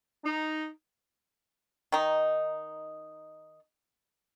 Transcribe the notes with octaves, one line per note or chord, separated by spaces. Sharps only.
D#4
D#3 D#4